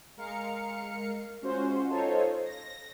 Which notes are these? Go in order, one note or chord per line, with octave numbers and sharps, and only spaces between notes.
G#3 A#4 F5 C#7
G#3 C#4 F4 F#4 C5
D#4 F4 A4 C5 C#5 D#5
A#6